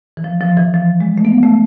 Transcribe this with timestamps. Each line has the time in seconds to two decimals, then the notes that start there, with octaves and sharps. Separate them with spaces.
0.17 E3
0.24 F3
0.41 F3
0.57 E3
0.74 F3
1.01 G#3
1.18 A3
1.25 B3
1.43 A3